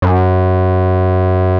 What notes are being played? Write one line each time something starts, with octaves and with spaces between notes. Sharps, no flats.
F#2